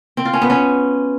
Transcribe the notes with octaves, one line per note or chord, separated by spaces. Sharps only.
C4
F4
C#4
B3
C#4